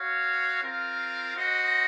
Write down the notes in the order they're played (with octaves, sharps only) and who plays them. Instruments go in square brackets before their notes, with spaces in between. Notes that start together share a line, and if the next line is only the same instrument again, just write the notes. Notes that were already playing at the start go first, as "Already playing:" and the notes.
Already playing: [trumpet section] F#4 C#5 F5
C4 F4 A#4 F5
F#4 C5 D#5 F#5